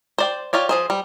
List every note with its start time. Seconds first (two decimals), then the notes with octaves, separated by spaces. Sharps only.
0.18 C5 D5 G5
0.53 F4 G4 C#5 D5
0.69 F3 G#4 C5
0.90 G3